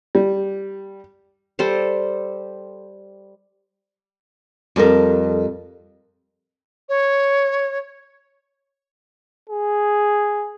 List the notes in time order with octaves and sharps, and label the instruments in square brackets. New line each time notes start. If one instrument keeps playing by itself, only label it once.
[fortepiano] G3
[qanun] G3 A4 C5
[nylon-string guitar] F2 G3 A4 A#4
[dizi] C#5
[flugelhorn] G#4